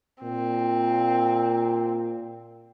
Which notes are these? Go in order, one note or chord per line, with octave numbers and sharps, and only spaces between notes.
A#2 C4